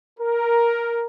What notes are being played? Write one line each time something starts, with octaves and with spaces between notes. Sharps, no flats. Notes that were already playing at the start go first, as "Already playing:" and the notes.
A#4